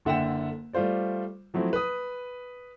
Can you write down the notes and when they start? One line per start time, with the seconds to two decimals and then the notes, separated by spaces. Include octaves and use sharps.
0.05 F#1 D3 E5 F#5 G5 E7
0.73 G3 A3 F4 C5 D5
1.54 F3 F#3 A3 C4 E4
1.73 B4 D#6